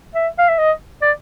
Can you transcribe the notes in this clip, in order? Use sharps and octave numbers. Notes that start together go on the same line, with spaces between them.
E5
F5
E5
D#5
D5